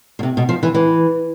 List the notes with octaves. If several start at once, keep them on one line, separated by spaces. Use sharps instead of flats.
B2
C3
B2
F3
E3
E3